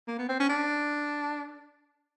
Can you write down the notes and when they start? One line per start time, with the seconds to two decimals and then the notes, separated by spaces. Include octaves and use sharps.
0.08 A#3
0.18 B3
0.29 C4
0.40 C#4
0.50 D4